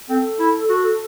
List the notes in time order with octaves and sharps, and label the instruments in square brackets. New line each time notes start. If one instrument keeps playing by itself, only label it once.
[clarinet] C4 [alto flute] A4
[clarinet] E4
F#4